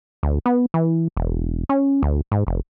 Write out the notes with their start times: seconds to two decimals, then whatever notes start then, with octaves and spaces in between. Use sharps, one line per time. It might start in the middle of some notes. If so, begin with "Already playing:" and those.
0.23 D2
0.46 B3
0.74 E3
1.17 E1
1.69 C#4
2.03 D2
2.32 G#2
2.47 F1